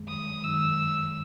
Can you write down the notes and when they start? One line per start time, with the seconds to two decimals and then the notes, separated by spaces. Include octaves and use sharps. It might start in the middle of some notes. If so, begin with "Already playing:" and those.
Already playing: F#2 D#3 G#3
0.08 D#6
0.44 F#2 D#3 G#3 E6